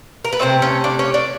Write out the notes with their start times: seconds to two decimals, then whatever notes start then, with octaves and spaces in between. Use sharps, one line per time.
0.25 A#4
0.33 B4
0.39 C3 E3 A3 C4 C5
0.62 C#4 C#5
0.84 D4 D5
0.99 C#4 C#5
1.14 D4 D5